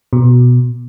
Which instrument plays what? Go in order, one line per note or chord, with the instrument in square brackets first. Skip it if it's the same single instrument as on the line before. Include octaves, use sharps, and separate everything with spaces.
[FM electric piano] B2